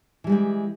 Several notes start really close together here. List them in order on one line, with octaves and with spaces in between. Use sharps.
E3 G3 G#3 G4